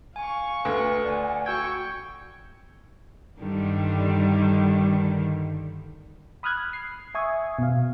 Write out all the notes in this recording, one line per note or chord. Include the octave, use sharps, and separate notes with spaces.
F5 G#5 C#6
D2 A4 B4
D5 F#5 G#5
F#4 G5 C#6 E6 G#6
G2 D3 D#3 G3
B5 D#6 F6 F#6 G#6
C7
E5 G#5 C#6 D#6 G#6
B2 F5